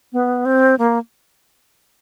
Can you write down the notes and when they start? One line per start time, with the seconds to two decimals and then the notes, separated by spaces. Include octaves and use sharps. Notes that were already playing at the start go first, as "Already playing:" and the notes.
0.13 B3
0.45 C4
0.79 A#3